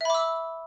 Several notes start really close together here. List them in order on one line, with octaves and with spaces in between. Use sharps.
E5 B5 D6 E6